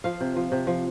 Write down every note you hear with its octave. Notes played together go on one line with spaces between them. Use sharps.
F3 F5
C3
F3
C3
F3